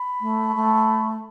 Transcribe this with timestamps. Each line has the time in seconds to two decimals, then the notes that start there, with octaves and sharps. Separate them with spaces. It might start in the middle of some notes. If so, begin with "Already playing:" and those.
Already playing: B5
0.21 A3
0.56 A3